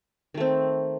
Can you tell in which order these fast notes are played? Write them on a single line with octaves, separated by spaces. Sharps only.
D#3 A3 C4